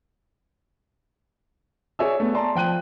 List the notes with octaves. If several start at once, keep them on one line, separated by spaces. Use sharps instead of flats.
G#4 C#5 D5 E5 G#5 E6
A3 B3
D5 A5 A#5 C6
F3 G5 F#6 D#7